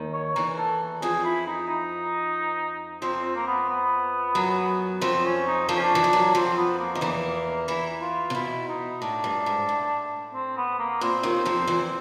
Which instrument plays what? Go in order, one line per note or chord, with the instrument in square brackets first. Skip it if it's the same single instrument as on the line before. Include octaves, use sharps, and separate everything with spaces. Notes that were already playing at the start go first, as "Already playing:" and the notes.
Already playing: [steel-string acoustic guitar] D#2 D#3
[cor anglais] C#5
[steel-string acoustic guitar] E2 E3 [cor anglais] A#4
[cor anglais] A4
[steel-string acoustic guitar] F2 F3 [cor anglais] G#4
[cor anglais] E4
D#4
D#4
[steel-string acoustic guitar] F2 F3 [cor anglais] C4
[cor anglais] C4
A#3
B3
B3
[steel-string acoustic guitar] F#2 F#3
[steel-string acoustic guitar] F2 F3 [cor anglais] C4
[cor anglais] C#4
D#4
[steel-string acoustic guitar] F2 F3 [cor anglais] D4
[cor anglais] C#4
D4
[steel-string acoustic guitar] E3
F3
F#2 F#3
[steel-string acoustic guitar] F2 F3 [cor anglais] C4
[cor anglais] B3
A#3
[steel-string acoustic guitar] D#3
[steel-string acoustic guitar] E2 E3 [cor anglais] A#3
[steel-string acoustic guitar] E2 E3 [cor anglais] E4
[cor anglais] F4
[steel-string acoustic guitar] C3
[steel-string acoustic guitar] B2 [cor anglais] E4
[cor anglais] D#4
[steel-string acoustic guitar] A2 [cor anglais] D4
[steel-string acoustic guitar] G2
G#2
A2
[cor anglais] C4
B3
A#3
[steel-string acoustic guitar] A#2 [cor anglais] C4
[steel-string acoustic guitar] D#2 D#3
F2 F3
E2 E3